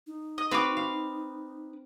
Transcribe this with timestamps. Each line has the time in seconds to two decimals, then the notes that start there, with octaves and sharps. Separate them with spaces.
0.07 D#4
0.38 D#5
0.51 C4 F#4 B4 F5 D6
0.77 F5